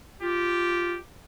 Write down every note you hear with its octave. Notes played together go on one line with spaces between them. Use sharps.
F4 G4